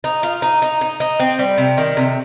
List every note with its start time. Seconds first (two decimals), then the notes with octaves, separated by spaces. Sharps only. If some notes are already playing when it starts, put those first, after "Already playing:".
0.04 D#4
0.23 F4
0.42 D#4
0.62 D#4
0.81 D#4
1.00 D#4
1.20 C4
1.39 G3
1.58 C3
1.78 D#3
1.97 C3